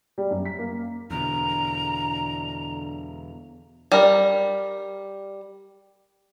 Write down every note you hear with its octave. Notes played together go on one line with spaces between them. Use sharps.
G3
F#2
B6
A#3
E2 B2 D3 A#5
G3 A#4